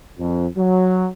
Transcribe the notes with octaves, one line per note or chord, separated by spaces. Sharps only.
F2
F#3